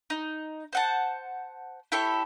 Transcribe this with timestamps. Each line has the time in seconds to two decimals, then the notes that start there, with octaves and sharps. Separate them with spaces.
0.10 D#4
0.73 C5 F#5 A5
1.92 E4 G4 A4 C#5